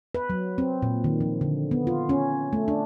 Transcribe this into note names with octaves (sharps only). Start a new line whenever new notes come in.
B4
F#3
C4
A#2
D#3
F3
D3
B3
F4
C#4
A3
D4